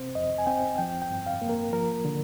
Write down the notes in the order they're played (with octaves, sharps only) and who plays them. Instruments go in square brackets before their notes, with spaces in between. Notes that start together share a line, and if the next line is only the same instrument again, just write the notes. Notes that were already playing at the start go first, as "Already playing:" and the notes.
Already playing: [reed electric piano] C3 C4 C5
F2 D#5
G#5
C4 G5
F3 G5
G5
G2
F5
A#3
A#4
F3 A#4
D3